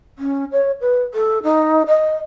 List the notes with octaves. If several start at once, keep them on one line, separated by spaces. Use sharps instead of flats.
C#4
C#5
B4
A4
D#4
D#5